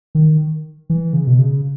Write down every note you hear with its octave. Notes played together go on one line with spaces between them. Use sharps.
D#3
E3
C#3
B2
C#3